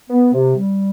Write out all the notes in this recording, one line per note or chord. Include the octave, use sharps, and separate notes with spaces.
B3
C3
G3